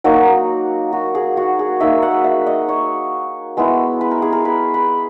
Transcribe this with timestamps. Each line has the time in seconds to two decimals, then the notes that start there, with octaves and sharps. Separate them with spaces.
0.04 F#3 A#3 D#4 F#4
0.93 F#4
1.15 G#4
1.37 F#4
1.59 G#4
1.80 F#3 A#3 D#4 E5
2.02 F#5
2.24 E5
2.47 D#5
2.69 C#5
3.57 G#3 B3 E4
4.01 B4
4.11 A#4
4.22 G#4
4.32 A#4
4.45 B4
4.74 B4